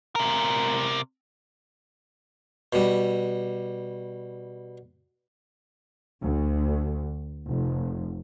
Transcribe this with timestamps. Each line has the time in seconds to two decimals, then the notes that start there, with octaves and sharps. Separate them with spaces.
0.15 C3 A#4
2.73 B2 G3
6.22 D2
7.48 F1